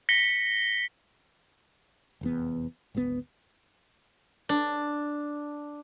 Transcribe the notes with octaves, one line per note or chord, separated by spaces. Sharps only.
A#6 B6 C#7 G7
F1 E2 B3
G#1 D2 D3 B3
D4